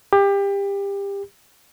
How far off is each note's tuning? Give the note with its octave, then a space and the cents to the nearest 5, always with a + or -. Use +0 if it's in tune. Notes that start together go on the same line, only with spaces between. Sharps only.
G4 +25